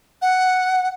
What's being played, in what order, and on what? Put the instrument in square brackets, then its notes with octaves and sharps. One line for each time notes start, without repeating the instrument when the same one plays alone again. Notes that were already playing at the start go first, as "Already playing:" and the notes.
[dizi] F#5